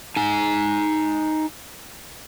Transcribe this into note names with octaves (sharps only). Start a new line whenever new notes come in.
D#4 G#5